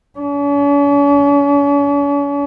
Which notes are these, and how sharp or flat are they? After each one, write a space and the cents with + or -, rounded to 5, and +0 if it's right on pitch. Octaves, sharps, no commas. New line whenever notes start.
C#4 +45